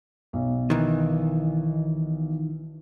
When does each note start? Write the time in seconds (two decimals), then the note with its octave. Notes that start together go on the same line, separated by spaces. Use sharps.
0.33 B1
0.70 D#3 E3